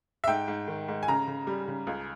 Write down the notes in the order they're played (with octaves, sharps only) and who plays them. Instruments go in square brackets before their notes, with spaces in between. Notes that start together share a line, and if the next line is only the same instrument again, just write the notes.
[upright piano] E5
G#2 G5
G#2
D#3
G#2
G#5
C#3 A#5
C#3
G3
C#3
C#2